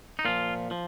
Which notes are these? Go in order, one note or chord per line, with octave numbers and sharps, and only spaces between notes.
D#4
A#2 F3 F4
F3